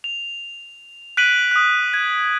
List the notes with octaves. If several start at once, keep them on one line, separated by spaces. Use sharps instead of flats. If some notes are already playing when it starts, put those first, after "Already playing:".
F7
F#6 B6 D7 D#7 F#7
D#6 F#6
G#6